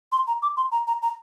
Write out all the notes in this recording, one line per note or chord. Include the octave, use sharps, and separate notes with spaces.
C6
A#5
D6
C6
A#5
A#5
A#5